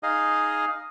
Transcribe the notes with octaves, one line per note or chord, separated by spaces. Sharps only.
D#4 G#4 D#5 F5